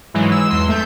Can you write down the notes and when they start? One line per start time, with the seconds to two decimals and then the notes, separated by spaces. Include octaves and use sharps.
0.14 G#2 E3 F#3 G#3
0.31 E6
0.50 E2 C6
0.69 A3 G6